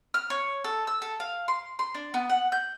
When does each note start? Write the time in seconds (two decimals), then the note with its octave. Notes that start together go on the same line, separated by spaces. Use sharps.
0.14 F6
0.30 C#5
0.64 A4
0.87 E6
1.02 A4
1.20 F5
1.48 C6
1.79 C6
1.94 D4
2.14 B3
2.30 F#5
2.52 G6